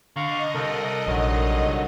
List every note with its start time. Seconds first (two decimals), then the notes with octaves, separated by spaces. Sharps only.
0.16 D3 D#5 F5 A#5 C#6
0.55 C2 A4 A#4
1.06 A#1 D3 D#3 F#3